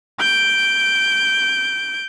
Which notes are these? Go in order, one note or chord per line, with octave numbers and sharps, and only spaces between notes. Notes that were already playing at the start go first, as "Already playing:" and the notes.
G6 D7